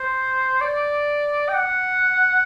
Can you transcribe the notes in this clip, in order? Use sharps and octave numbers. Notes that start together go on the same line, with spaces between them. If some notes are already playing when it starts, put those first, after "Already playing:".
Already playing: C5
D5
G5
F#5